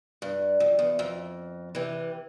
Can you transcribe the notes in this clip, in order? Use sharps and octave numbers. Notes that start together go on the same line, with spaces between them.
G2
F2
E2
F2
C3 E3